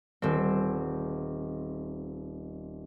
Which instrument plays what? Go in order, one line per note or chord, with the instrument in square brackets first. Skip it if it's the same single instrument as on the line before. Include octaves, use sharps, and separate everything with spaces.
[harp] D#1 C4